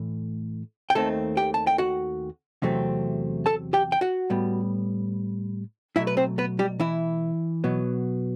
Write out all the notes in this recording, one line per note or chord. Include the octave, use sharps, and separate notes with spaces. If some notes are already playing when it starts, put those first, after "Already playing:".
Already playing: A2 E3 A3
G5
D#2 D#3 A3 C4 A4 A5
G4 G5
A5
G5
F#4 F#5
E2 C3 F#3 A3 C4
A4 A5
G4 G5
G5
F#4 F#5
A2 G3 B3
B2 F#3 A3 E4 E5
B4
C4 C5
B3 B4
G3 G4
E3 E4
B2 F#3 B3